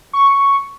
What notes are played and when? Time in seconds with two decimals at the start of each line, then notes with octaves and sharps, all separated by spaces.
0.13 C#6